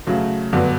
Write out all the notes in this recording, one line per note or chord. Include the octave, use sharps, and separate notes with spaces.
C#3 F#3 A3
G2 D3 F#3 B3